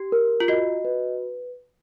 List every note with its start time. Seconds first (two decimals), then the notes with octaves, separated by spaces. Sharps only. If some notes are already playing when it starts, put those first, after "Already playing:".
Already playing: G4
0.12 A#4
0.40 F4
0.48 F#4 D#5
0.85 B4